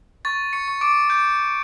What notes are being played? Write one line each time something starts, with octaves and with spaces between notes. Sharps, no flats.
C#6 A6
C#6 C#7
C#6
D6 D7
D6 G6 D7